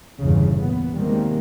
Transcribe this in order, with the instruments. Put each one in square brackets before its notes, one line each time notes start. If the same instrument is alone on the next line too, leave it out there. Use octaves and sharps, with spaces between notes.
[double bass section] G1 E2 A#2 C#3
A#2 B3
C3 D#3 G3 G#3 A#3